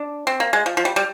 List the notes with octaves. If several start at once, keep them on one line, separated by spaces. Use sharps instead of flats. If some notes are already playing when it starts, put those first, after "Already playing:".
Already playing: D4
C4
A#3
G#3
F3
F3
G3
G3